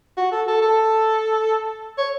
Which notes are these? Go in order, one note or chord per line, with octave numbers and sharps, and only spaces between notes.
F#4
A4
A4
A4
C#5